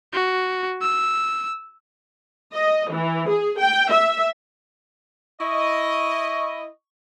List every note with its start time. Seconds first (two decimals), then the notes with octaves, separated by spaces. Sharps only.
0.13 F#4
0.81 E6
2.54 D#5
2.92 E3
3.30 G#4
3.59 G5
3.91 E5
5.39 E4 D#5 C#6